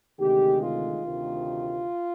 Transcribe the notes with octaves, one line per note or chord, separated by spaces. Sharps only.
D2 C3 D#3 G#3 G4
F4
D2 C3 D#3